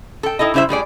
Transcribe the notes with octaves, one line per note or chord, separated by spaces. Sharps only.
A4 G5
D#4 E4 A4 D#5
C#3 G3 E4 C5 E5
A2 G3 G#4 D5